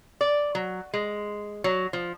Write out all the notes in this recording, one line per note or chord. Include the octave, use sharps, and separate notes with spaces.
D5
F#3
G#3
F#3
F3